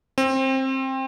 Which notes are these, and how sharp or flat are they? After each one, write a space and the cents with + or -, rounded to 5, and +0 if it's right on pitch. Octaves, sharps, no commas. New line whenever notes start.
C4 +20